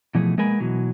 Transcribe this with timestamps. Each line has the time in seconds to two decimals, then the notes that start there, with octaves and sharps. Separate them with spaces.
0.15 B2 E3 F3 A3 G#4
0.38 G#3 A#3 B3 A#4 G#5 B5
0.60 B2 E3 F#3